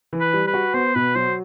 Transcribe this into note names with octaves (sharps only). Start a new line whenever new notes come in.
E3
B4
G3
B4
F#4
B3 C5
B2 B4
F#3 C5